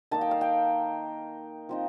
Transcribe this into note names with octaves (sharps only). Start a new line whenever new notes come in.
D#3 A#3 D#4 A5
G5
F5
G5
F3 C4 D#4